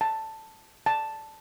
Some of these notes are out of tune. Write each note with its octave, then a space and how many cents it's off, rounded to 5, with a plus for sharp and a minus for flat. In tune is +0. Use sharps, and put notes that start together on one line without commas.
A5 +5
A5 +0